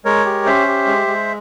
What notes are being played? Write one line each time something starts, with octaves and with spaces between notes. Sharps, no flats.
G#3 A#4 C#5
G4
C#4 C5 E5
G4
G#3
G#3